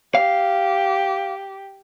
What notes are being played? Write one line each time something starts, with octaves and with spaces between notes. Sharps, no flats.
G4 F5